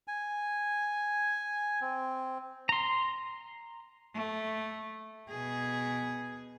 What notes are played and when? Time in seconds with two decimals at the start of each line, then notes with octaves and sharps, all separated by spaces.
0.08 G#5
1.81 C4
2.69 A#5 C6
4.14 A3
5.30 B2 G#4